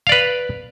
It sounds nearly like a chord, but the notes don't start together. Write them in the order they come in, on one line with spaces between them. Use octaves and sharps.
F5 D5 B4